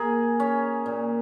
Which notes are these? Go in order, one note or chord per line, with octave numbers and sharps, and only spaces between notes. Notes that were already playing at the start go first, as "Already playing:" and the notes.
Already playing: A#3 G#4
C#4
A#2